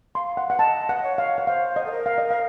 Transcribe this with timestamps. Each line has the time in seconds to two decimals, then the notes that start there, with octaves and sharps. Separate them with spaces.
0.15 F5 C6
0.37 F#5
0.50 F5 F#5
0.59 D#5 A5
0.89 F#5
1.03 C#5
1.18 F5
1.38 F#5
1.47 C5 F5
1.76 D#5
1.86 A4
1.91 A#4
2.06 F5
2.18 D#5
2.31 F5